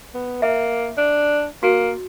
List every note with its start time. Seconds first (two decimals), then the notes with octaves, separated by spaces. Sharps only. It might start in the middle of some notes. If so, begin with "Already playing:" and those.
0.14 B3
0.42 A#3 E5
0.97 D4
1.63 A#3 F#4